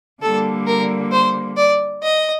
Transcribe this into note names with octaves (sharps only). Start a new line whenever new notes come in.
D3 G3 A#3 A4
A#4
C5
D5
D#5